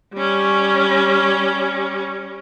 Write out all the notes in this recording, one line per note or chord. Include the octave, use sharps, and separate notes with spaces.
G3 C#4